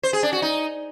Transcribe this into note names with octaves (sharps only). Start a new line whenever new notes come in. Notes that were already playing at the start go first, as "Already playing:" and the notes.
C5
G#4
D4
F#4
D#4